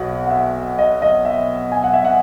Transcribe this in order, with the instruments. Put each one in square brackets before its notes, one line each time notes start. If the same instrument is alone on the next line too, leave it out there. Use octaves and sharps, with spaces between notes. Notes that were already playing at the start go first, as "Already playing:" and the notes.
Already playing: [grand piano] B1 B2 F#5
F#5
E5
D#5
D#5
E5
G#5
F#5
E5
F#5